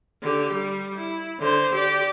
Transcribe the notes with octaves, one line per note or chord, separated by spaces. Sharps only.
D3 G4
G3
E4
D3 C5
G4 D5